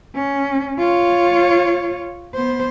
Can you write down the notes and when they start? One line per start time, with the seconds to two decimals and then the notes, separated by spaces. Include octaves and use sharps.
0.15 C#4
0.79 F4 C#5
2.35 B3 C5